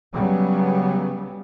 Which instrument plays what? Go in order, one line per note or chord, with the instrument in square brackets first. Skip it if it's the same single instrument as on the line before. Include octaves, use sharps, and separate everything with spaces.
[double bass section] C#3 F#3 G3 B3